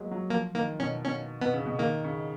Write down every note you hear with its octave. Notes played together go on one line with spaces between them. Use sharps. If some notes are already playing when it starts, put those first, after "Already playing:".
Already playing: F#3 G#3 A#3 B3
F#3
F3 A#3
D#3 A#3
B2 C#4
B2 C#4
B2 B3
C#3
B2
D#3 A#3
C#3